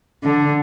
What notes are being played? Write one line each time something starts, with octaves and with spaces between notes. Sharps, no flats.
D3